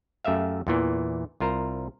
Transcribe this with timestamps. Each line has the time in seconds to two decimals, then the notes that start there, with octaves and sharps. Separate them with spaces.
0.25 F#2 A3 G4 E5 F5
0.67 E2 A#2 E3
1.40 C2 F4 A#4 C5 A#5